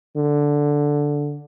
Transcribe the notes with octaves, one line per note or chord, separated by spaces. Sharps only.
D3